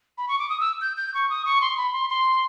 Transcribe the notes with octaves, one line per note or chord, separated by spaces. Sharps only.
B5
C#6
D6
D#6
E6
G6
G6
C#6
D#6
C#6
C6
B5
C6
C6